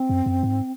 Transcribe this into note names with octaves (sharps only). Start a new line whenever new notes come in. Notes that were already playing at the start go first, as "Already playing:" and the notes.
Already playing: C4
F#2
F#2
G#2